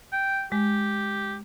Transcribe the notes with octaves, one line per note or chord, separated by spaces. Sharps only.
G5
G#3 G4